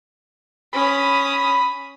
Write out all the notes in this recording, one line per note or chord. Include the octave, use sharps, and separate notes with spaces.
C#4 B5 D#6